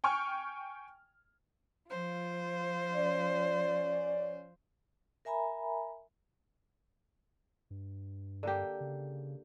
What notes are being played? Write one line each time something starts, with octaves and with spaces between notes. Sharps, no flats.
G5 G#5 C#6 F6
F3 F4 C5
C#4 D5
A#4 E5 G#5 A#5 B5
G2
D3 A#3 G4
C#3